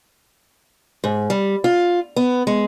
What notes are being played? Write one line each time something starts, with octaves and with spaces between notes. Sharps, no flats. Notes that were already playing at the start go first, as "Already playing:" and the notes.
G#2
G3
F4
B3
G#3